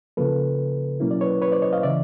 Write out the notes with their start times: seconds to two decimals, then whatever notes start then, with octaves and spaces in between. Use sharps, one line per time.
0.17 C#3 F3 A#3 A4 B4
1.00 B2 F#3 A#3 C#4 E4
1.11 D5
1.21 B4 C#5
1.42 B4 C#5
1.52 C5 D5
1.62 C#5 D#5
1.73 D#5 F5
1.83 C#3 E3 D5 E5